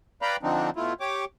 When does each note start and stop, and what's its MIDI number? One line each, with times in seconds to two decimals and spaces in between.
0.22 0.36 71
0.22 0.36 74
0.22 0.36 77
0.22 0.36 79
0.22 0.36 82
0.22 0.36 83
0.43 0.70 50
0.43 0.70 53
0.43 0.70 60
0.43 0.70 62
0.43 0.70 63
0.76 0.93 47
0.76 0.93 57
0.76 0.93 64
0.76 0.93 65
1.00 1.25 67
1.00 1.25 73
1.00 1.25 86